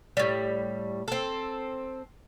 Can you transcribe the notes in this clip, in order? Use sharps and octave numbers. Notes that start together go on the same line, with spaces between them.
A2 G3
C4 A4